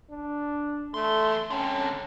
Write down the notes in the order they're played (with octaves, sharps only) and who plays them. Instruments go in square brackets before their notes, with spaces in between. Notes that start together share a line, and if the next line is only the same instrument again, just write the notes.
[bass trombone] D4
[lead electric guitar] E2 C6 [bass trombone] A3
[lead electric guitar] D3 C4 [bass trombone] C#4